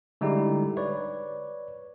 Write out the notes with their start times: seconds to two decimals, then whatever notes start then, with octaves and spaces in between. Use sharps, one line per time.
0.21 D3 G3 G#3 D#4 E4 G4
0.77 B4 C#5 D5